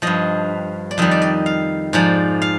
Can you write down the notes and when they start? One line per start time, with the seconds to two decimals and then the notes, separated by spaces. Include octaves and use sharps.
0.02 G2 F3 D#5
0.91 D5
0.98 F2 D#3 G3 D#5
1.11 D5
1.22 D#5
1.46 F5
1.93 G#2 F3 D5
2.42 F5